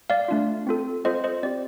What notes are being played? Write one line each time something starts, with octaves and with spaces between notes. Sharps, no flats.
D5 F5
A3 D4 F4
C4 F4 A4
C4 F4 A4 C5 D#5
C5 D#5
C4 G4 D5